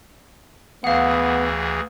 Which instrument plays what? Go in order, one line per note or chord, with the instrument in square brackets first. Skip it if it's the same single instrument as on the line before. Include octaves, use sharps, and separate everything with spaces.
[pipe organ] D2 E3 G#4 [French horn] B3 [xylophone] F5 F#5